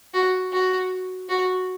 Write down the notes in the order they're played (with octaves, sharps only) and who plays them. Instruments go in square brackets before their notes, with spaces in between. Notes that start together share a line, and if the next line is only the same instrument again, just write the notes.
[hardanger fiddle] F#4
F#4
F#4